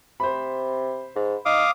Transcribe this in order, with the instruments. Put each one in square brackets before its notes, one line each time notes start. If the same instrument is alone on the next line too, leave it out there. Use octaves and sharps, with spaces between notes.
[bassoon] C3 [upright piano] C5 B5
[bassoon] G#2
[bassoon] D#4 [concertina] F5 D6 D#6